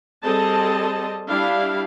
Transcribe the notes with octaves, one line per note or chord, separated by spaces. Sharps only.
G3 C4 G#4 A4 D#5 A5
G3 D4 E4 G4 F5